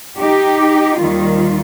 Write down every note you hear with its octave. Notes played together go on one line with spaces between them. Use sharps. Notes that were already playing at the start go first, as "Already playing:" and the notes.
D#4 G4
D#2 D#3 G3 F4